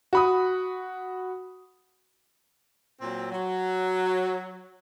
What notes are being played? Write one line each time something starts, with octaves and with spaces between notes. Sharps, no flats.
F#4 B5 D#6
A#2 F#3 C4
F#3